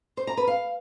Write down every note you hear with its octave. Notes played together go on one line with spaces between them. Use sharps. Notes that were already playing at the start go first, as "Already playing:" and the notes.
C5
A#5
B4
F5